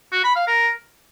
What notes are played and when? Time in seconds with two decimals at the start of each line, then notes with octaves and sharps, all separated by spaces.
0.12 F#4
0.24 B5
0.36 F5
0.48 A#4